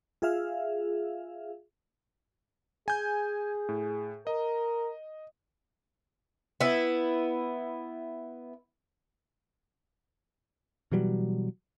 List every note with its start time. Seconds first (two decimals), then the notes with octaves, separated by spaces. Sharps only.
0.22 F4 G#4 E5 F5
2.88 G#4 G#5 G6
3.69 A2
4.27 A#4 D#5
6.61 B3 E4
10.92 B2 E3 F#3 G3